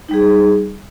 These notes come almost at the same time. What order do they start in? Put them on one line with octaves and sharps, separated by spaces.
D#4 G3 G#4